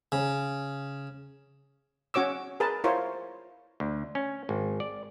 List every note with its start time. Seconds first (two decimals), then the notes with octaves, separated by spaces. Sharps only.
0.12 C#3
2.14 C#4 F#4 C#5 D6 E6
2.60 G#4 A#4 B4 A5
2.84 E4 F4 A#4 C5 C#5
3.80 D2
4.15 C#4
4.49 G#1
4.80 D5